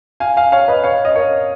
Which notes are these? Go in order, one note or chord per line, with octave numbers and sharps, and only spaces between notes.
F5 G#5
F5 G#5
C#5 F5
B4 D#5
C#5 F5
D#5
A#4 C#5